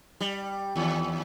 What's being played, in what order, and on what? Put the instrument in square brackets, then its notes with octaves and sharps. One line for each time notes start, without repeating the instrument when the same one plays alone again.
[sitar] G3
D#2